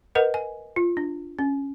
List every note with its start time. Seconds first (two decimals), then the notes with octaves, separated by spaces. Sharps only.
0.15 A#4 B4 D#5 F#5
0.34 G#5
0.76 F4
0.97 D4
1.39 C#4